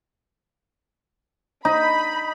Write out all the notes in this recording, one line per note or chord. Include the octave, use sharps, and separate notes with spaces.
D#4 B5